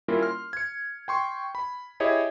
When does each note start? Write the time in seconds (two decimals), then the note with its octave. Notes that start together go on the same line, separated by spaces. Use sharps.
0.08 G3 A#3 C#4 E4 F4 A#4
0.23 C6 F6
0.53 G#6 C#7
1.08 G5 C6 C#6
1.55 B5
2.00 E4 G4 G#4 C#5 D#5 E5